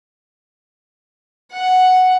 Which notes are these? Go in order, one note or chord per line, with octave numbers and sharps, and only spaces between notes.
F#5